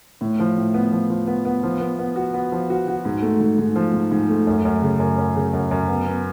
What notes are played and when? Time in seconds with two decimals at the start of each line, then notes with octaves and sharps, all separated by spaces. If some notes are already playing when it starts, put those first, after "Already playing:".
0.21 A2
0.39 F3
0.57 A2
0.74 B3
0.92 F3
1.10 F3
1.27 B3
1.45 B3
1.63 F3
1.80 B3
1.99 B3
2.16 F#4
2.34 B3
2.52 F3
2.70 F#4
2.88 F#4
3.05 G#2
3.22 A3
3.40 G#2
3.58 G#2
3.76 F3
3.93 G#2
4.11 G#2
4.29 A3
4.47 F#2
4.65 F#2
4.82 C#3
5.00 F#2
5.18 F#2
5.36 C#3
5.53 F#2
5.71 F#2
5.88 B3
6.07 B3